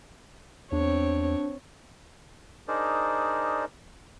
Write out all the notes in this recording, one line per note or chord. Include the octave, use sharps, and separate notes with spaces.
E2 C4 D4 C#5
D4 D#4 G#4 A#4 C5 D5